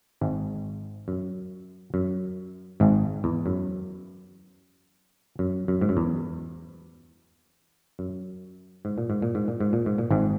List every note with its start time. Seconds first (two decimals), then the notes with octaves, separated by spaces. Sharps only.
0.21 G#1 G#2
1.08 F#2
1.94 F#2
2.80 G#1 G#2
3.24 E2
3.46 F#2
5.39 F#2
5.68 F#2
5.81 G#2
5.89 F#2
5.97 E2
7.99 F#2
8.85 G#2
8.98 A#2
9.10 G#2
9.22 A#2
9.35 G#2
9.48 A#2
9.60 G#2
9.73 A#2
9.86 G#2
9.98 A#2
10.11 G#1 G#2